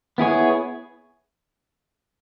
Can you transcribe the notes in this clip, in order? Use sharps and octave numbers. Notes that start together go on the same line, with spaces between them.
B3 E4 G#4 C#5